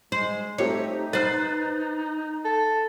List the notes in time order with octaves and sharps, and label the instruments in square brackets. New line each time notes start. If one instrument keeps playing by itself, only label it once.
[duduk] G#3 [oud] C5
[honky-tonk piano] A3 C4 G4 [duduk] D#4 [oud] C#5
[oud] B4 C5 [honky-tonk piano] F#6 A6
[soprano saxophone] A4